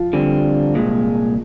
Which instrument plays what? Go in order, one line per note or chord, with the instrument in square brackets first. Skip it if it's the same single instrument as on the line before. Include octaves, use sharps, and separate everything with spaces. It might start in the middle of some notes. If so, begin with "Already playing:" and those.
Already playing: [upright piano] F3 F4
[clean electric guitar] D3 G3 C4
C2 A#2 G#3